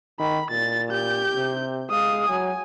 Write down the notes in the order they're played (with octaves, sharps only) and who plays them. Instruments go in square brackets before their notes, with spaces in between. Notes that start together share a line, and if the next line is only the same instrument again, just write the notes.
[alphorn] D#3 [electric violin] B5
[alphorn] A#2 [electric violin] A6
[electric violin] G4 G6
[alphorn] C3
[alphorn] G#3 [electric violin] F5 D#6
[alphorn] F#3 [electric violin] G#5